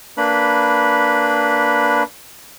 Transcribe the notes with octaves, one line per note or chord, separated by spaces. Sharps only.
A#3 D4 B4 B5